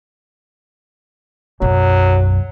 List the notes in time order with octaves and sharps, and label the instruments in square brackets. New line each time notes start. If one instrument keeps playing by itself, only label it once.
[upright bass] B1 F#2 [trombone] F#3